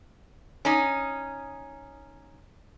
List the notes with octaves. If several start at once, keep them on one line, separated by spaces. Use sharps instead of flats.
C#4 D#4